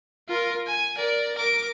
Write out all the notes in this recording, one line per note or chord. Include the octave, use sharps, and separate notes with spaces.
F4 A#4
G#5
A#4 D5
A#4 D6